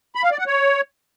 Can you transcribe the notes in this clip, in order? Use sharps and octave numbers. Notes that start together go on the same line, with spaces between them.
B5
F5
D5
F#5
C#5